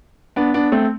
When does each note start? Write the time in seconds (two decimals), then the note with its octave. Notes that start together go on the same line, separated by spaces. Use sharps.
0.36 B3 D4
0.54 B3 D4
0.72 A3 C4